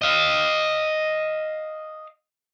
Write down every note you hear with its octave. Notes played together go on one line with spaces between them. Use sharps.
D#5 F5